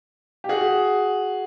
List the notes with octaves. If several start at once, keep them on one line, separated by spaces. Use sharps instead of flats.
G4
F#4 G#4